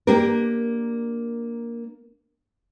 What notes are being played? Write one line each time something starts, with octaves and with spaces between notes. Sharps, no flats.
A#3 D4 G4 A#4